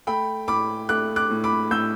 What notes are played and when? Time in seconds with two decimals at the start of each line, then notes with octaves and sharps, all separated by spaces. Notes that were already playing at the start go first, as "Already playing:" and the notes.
0.07 A3 G5 B5
0.48 A2 B5 D6
0.89 A3 D6 F#6
1.16 D6 F#6
1.30 A2
1.44 B5 D6
1.71 A2 E6 G6